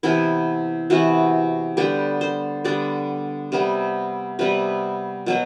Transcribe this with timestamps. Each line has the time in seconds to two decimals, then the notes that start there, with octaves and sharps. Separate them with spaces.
0.03 C3 E3 B3 E4
0.90 C3 E3 B3 F#4
1.77 D3 G3 B3 G4
2.21 C5
2.64 D3 G3 B3 D5
3.52 C3 G3 B3
4.39 C3 G3 B3 B4
5.26 B2 F#3 B3